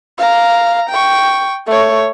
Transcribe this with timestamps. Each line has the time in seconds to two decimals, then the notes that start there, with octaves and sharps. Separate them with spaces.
0.18 F5 A#5
0.90 G5 C#6
1.67 A3 C#5